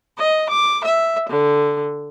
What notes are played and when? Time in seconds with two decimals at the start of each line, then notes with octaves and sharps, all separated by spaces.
0.18 D#5
0.50 D6
0.85 E5
1.28 D3